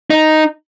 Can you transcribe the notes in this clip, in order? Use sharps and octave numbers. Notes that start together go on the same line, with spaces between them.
D#4